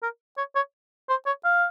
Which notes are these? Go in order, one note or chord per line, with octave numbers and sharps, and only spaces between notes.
A#4
C#5
C#5
C5
C#5
F5